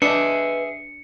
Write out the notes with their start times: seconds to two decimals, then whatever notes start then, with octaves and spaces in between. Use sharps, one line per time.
0.02 D4 G#4 B4 D#5 E5 C#7